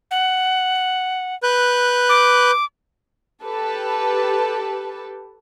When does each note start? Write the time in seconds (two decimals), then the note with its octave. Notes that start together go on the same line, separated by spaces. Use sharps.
0.11 F#5
1.43 B4 F#6 G6
2.09 D6
3.44 G4 A4 B4 A5